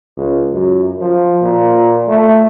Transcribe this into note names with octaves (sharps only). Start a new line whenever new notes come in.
C#2
F#2
F3
A#2
A3